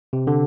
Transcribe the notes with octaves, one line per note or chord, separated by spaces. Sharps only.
C3
D3